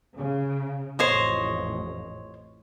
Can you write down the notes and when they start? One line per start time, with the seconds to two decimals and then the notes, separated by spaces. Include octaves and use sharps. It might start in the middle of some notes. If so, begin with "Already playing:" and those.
0.16 C#3
0.99 A1 F2 C5 C#5 D#5